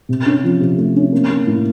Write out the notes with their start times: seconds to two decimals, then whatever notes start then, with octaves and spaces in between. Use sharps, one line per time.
0.09 C3
0.26 C#4
0.44 F3
0.60 C3
0.78 A3
0.95 C#4
1.12 A#3
1.30 A#3
1.47 A2